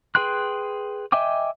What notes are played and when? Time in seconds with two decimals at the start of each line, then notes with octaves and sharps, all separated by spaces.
0.15 G#4 B4 G5 C6 F#6
1.12 D#5 E5 G5 G#5 D6